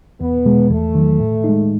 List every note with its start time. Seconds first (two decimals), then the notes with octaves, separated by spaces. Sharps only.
0.20 E2 B3
0.45 B2 G#3
0.70 E2 A3
0.95 D#3 F#3
1.20 A2
1.44 G#3 D#4